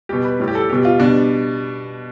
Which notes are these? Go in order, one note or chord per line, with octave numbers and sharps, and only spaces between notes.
B2 G3 G4
B4
A2 G3
G4
A4
B2 G3 G4
F4
B2 G3 D4